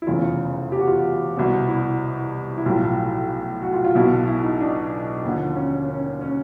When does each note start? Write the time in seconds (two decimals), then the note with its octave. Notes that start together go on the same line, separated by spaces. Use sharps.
0.02 E4
0.07 F1 E2 C#3 E3 F4
0.72 G4
0.79 F#4
0.87 F4
0.95 F#4
1.36 C2 B2 F#4
1.69 E4
2.58 E4
2.66 B1 A2 F3 F4
3.62 F#4
3.74 F4
3.85 F4
3.95 B1 B2 E4
4.28 E4
4.44 D#4
4.60 D4
5.24 D#2 D3 F3
5.56 C#4
5.89 C#4
6.21 C#4